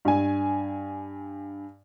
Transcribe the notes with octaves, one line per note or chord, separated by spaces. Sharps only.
G2 G#5